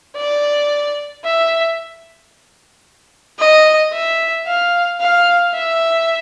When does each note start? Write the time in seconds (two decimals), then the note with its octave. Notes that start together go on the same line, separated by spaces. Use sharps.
0.17 D5
1.25 E5
3.39 D#5
3.93 E5
4.46 F5
5.00 F5
5.54 E5